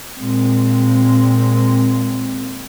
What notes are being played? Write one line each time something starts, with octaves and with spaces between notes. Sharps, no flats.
A#2 G#3 C4